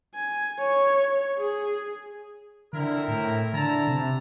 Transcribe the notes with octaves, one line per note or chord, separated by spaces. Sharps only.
G#5
C#5
G#4
D3 C4 E4 A#4
A2
D3 E4 A5 A#5
C3